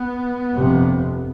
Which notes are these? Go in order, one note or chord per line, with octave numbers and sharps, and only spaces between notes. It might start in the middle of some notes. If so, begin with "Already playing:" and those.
Already playing: B3
G1 F2 C3